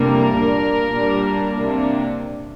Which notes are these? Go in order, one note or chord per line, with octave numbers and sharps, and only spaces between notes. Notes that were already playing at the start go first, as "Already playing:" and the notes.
Already playing: F2 C3 G3 A#3 D4 A#4
A#2 A#3 D4
A#2 G3 A#3 D4
C3 A#3 D4